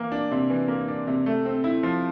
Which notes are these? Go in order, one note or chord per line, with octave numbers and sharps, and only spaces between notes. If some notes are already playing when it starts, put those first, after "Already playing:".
Already playing: E3 A#3
D4
C3
E3
A#3
D4
C3
A3
C4
E4
F3